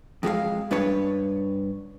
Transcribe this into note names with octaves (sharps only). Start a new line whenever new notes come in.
F2 G#3 F#4 F5
G2 D4 B4 C#5